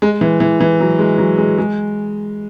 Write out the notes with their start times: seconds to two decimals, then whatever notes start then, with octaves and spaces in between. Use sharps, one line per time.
0.02 G#3
0.21 E3
0.40 E3
0.60 E3
0.80 F#3
0.99 G#3
1.18 F#3
1.38 G#3
1.58 G#3